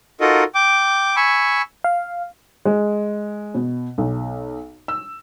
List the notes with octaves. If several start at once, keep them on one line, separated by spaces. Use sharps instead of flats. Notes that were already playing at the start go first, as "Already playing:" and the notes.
D#4 F4 F#4 A4 A#4 D#5
G5 D6
G#5 B5 C#6 E6
F5
G#3
B2
B1
E6